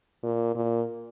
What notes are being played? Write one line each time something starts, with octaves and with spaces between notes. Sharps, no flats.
A#2
A#2